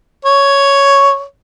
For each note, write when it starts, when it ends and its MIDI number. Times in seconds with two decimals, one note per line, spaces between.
0.25 1.23 73